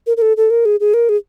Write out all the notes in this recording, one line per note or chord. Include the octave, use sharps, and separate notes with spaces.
A#4
A#4
A4
A4
A#4
G#4
G#4
A#4
G#4